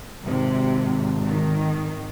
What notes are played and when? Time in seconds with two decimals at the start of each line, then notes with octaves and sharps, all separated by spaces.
0.24 G#1 C3
1.27 D#3